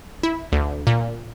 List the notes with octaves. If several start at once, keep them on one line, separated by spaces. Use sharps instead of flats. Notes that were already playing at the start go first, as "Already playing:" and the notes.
E4
D2
A#2